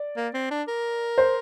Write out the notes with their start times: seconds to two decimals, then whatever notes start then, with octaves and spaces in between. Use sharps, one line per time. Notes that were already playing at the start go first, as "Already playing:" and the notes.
Already playing: D5
0.17 A#3
0.34 C4
0.51 D4
0.68 A#4
1.18 C5